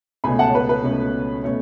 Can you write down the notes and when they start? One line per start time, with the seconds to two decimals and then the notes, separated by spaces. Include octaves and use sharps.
0.24 C#2 B2 A3 C#4 G#5 B5
0.39 F#5 A5
0.49 C#5
0.55 B4
0.69 B4
0.84 C#2 B2 A3 C#4
1.44 B2 A3 C#4 C#5